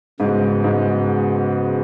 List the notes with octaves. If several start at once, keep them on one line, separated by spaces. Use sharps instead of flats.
G#2 C#3 G#3 B3 F#4
G#2